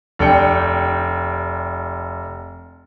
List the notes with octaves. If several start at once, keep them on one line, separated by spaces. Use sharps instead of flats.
F1 D4 G5 C#7